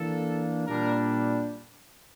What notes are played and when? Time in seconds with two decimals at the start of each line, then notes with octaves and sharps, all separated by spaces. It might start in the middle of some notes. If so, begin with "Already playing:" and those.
Already playing: E3 A#3 D4 A4
0.67 A#2 G3 D4 A#4